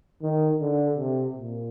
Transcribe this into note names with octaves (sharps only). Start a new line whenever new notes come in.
D#3
D3
C3
A#2